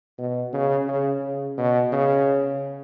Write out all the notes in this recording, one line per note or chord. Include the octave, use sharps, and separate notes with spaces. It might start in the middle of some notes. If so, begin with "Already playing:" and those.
B2
C#3
C#3
C#3
B2
C#3